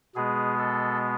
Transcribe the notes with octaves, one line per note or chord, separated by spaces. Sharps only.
B2 G#3 B3 G#4
A4